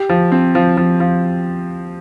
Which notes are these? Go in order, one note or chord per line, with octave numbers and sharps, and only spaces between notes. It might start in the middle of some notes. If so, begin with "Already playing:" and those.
Already playing: G4
F3
C4
F3
F3
F3